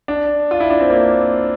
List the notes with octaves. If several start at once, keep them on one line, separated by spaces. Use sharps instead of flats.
D4
F4
E4
D4
C4
A#3